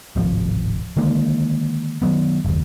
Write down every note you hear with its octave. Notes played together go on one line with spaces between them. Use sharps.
D1 G#1 C3 F3
D3 D#3 G#3 A#3
D#3 F#3 B3
F#1 D#2